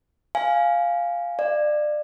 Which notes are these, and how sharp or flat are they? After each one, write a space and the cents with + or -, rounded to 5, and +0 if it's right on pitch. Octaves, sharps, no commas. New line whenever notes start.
F5 +0 G#5 +0
D5 +25 F5 -35